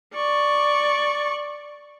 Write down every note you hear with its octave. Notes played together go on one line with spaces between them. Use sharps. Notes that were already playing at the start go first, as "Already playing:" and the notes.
D5 C#6